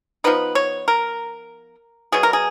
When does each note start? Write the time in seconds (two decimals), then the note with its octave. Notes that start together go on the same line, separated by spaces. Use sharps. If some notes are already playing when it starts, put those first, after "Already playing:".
0.24 F3 B3 D#4 B4
0.55 C#5
0.88 A#4
2.12 B2 F#3 B3 G#4
2.23 A#4
2.33 G#4